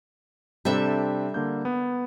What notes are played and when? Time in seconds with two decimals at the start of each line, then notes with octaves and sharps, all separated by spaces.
0.65 C3 G3 C4 D4 A4 E5
1.34 D3 A#3 G6
1.65 B3